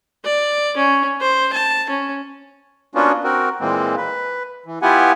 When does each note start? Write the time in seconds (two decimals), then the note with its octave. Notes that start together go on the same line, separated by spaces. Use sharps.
0.24 D5
0.77 C#4
1.21 C5
1.53 A5
1.90 C#4
2.95 A#3 B3 C#4 D4 F4 F#4
3.24 C4 F#4 A#4
3.61 A#2 E3 G#3 A#3 C4
3.97 B4
4.66 E3
4.82 B3 E4 F4 G4 F#5 G#5